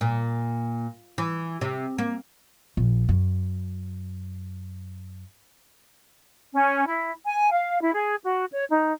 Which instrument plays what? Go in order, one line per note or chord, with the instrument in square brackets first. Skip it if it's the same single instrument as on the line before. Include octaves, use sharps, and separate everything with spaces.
[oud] A#2
E3
C3
A#3
[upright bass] A#1
F#2
[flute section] C#4
E4
G#5
F5
E4
G#4
F#4
C#5
D#4